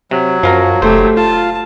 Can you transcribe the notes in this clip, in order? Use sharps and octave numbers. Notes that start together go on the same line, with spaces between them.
C3 F#3
F#2 F3 F#4 A#4 A#5
F1 A3 G4 C5
F4 A5